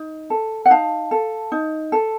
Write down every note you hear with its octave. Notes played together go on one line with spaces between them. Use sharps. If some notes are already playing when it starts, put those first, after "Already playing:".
Already playing: D#4
A4
F#5
D#4 F5 A5
A4
D#4
A4